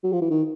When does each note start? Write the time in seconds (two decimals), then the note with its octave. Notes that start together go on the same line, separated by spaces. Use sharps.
0.03 F#3
0.12 F3
0.21 E3
0.30 D#3